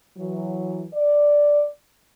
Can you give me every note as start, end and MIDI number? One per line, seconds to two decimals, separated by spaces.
0.17 0.86 52
0.17 0.86 54
0.94 1.67 74